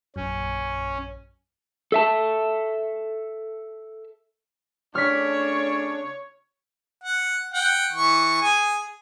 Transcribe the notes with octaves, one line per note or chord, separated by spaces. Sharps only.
A#1 F#2 C#4
A4 E5 A5
C#3 A3 D4 C#5 F6 B6
F#5
F#5 G5
E3 C#6
G#4 G#5